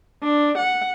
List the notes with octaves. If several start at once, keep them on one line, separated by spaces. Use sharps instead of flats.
D4
F#5